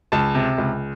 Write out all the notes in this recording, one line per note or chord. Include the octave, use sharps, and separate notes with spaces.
C#2 A5
C3
C#2